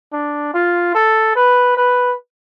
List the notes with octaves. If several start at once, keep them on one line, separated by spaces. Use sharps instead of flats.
D4
F4
A4
B4
B4